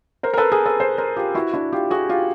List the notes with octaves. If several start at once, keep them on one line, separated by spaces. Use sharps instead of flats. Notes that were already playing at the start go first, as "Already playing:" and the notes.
A#4 C5
A#4
A4 B4
G#4 A#4
A4 B4
A#4 C5
A#4 C5
F4 G4
E4 F#4
D4 E4
F4 G4
F#4 G#4
F4 G4